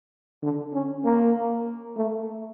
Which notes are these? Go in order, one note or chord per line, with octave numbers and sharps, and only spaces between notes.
D3
C#4
A#3
A3